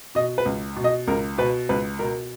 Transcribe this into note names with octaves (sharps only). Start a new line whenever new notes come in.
B2 D#5
B4
C#2
B2
D#5
C#2 A#4
B2 B4
C#2 B4
B2 A#4